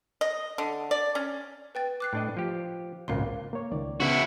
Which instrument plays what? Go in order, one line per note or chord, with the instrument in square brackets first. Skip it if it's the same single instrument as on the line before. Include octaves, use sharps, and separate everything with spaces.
[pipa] D#5
D3
D5
C#4
[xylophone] B4 G5 A6
D6 F#6 C7
[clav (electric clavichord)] A2 D4 D#5
F3 G4
[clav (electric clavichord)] G#1 C#2 A#2 [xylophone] A#4 F5 C6
[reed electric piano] A#3 C#5
C#2 D#3 D5
[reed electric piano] C#3 B3 [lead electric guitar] E4 F#4